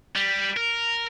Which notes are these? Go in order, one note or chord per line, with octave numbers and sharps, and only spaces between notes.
G3
A#4